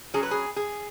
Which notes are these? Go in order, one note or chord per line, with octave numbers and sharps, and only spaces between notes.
F#3 C#4 G#4
B4
G#4
G#4